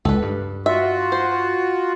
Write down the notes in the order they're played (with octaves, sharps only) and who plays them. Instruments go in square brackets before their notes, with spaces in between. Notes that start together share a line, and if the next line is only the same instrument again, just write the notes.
[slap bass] C#2 [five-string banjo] A4 B4
[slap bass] G2
[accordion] F4 F#4 [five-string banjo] E5
[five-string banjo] C5